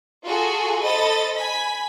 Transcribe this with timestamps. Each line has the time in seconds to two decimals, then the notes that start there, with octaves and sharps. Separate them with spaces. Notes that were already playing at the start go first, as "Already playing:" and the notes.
0.25 F4 F#4 G#4 A4
0.83 A4 C5 D#5 B5 A6
1.35 G#5 B5 B6